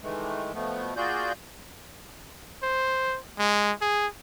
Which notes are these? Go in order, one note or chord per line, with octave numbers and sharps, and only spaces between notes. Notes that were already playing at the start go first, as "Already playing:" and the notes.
D#3 E3 G#3 A3
B2 F3 A3 B3
A#3 F4 F#4 G#4 D5 G6
C5
G#3
G#4